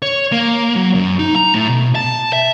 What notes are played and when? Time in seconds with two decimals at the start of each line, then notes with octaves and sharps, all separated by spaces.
0.02 C#5
0.32 A#3
0.76 F#3
0.95 F#2
1.19 D#4
1.36 A#5
1.54 A2
1.68 B2
1.95 A5
2.33 E5